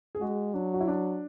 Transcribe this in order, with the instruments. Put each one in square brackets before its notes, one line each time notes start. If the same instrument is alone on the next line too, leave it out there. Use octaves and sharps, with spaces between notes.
[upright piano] G#4
[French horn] G#3 [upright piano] F#4
[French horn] F#3 [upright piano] D4
[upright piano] F#4
E4
D4